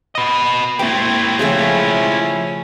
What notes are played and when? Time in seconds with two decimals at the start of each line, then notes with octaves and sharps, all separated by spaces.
0.15 B4 D#5
0.79 A#3 C4 E4 G4 G5
1.39 C#3 F3 A3 C#4 E5